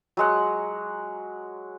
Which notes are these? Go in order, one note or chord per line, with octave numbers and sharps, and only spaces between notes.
F#3 G#3 F#5